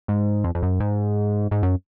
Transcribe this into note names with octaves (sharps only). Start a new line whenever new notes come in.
G#2
F2
F2
F#2
G#2
G#2
F#2